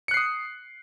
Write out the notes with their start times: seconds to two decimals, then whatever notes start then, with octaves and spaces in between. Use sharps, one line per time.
0.08 C#7
0.11 F#6
0.14 C7
0.17 D#6